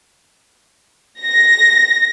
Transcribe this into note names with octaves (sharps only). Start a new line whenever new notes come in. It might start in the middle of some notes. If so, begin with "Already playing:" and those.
A#6